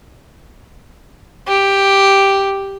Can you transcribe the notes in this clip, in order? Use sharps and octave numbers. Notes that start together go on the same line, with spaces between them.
G4